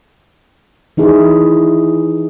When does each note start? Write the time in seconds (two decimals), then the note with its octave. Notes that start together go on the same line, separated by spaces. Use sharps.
0.97 E3 D#4 E4 G#4